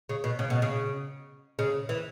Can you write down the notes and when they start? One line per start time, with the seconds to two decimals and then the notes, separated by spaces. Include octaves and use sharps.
0.09 C#3
0.24 B2
0.39 C#3
0.50 B2
0.62 C#3
1.59 C#3
1.89 E3